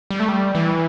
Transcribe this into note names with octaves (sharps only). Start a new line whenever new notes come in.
G3
A3
G3
E3